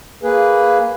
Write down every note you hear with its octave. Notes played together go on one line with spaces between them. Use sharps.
A#3 G#4 B4